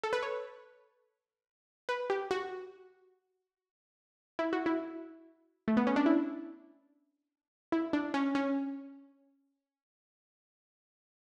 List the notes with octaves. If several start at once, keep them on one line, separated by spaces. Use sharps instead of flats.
A4
B4
C#5
B4
G4
F#4
E4
F#4
E4
A3
B3
C#4
D4
E4
E4
D4
C#4
C#4